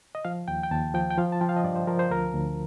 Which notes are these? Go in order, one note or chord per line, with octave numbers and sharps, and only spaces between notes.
D#5
F3 F5
D#2 G5
G5
D#2 A5
F3 G5
G5
F3 F5
A5
F3 G5
F5
D#5
G2 D5
C5
F3 A#4
C5
D2 A#4
D2